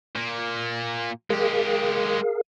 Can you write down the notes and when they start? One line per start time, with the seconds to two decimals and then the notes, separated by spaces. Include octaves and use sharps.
0.15 A#2 A#3
1.30 G#3 G4 G#4 A#4 F5